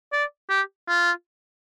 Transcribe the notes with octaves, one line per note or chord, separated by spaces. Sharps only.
D5
G4
F4